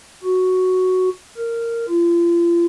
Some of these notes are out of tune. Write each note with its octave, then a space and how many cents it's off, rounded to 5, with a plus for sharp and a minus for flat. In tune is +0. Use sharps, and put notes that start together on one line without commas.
F#4 +0
A#4 -10
F4 -35